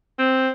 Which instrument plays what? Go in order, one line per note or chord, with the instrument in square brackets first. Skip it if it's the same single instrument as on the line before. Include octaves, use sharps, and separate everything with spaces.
[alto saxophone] C4